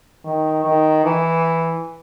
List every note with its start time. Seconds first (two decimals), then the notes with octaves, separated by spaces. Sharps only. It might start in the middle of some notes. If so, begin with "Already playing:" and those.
0.25 D#3
0.64 D#3
1.04 E3